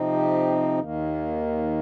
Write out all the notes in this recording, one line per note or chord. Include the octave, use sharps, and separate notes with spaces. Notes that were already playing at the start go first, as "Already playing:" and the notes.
Already playing: C3 F3 C4 D#4
G4
D#2 D#3 A#3